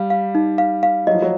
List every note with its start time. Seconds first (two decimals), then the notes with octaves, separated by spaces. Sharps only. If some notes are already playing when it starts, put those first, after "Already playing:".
Already playing: G3 F5
0.10 F5
0.35 D#4
0.58 F5
0.83 F5
1.07 F#3 D#5
1.15 F3
1.22 F#3